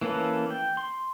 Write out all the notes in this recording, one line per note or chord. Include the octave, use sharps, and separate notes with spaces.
E3 A#3 C#4 A4 B4
G5
C6